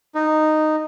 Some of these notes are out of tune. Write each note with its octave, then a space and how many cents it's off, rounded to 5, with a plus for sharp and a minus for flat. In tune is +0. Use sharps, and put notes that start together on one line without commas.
D#4 -10